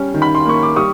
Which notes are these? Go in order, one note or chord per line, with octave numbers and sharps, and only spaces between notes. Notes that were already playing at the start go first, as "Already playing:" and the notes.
Already playing: G3 C#4
D#3
B5
C6
A#3 C#6
D6
G3 C#6 D#6